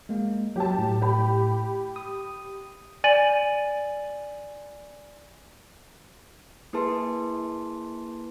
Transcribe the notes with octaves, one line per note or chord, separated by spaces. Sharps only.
G#3 A#3
F#3 G4 A5
A2
G4 B5
D#6
D5 G#5 A6 D#7 F#7
A#3 E4 G#4 B4 A5 C6